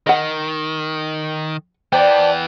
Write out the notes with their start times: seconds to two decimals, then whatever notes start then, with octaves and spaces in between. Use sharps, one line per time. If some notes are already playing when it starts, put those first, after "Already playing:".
0.07 D#3 D#5 F#5
1.93 E3 B3 C5 D5 G5 A5